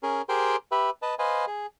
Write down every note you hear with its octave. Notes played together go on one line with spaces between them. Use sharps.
C#4 G#4 A#4
G4 G#4 A#4 C5 G5 C6
G4 B4 E5 B5
B4 D#5 A5
B4 C5 D#5 F5 G#5
G#4